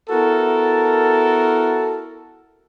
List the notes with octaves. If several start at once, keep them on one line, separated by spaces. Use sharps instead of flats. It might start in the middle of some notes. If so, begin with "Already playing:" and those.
B3 E4 F#4 A4 A#4